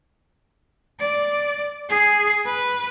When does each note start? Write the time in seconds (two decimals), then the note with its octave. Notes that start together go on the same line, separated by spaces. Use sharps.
0.99 D5
1.89 G#4
2.45 B4